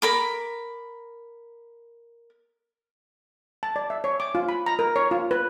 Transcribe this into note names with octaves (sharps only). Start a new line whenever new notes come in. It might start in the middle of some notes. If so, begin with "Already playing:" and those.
A#4 B5 D6
A5
D5
E5
C#5
D6
F4
B5
A#5
A#4
C#5
F4
B4